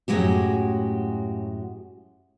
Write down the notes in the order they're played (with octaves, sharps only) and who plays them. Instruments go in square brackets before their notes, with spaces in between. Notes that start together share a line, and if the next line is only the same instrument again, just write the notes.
[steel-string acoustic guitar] F#2 A2 C#3 G#3 F#4 G4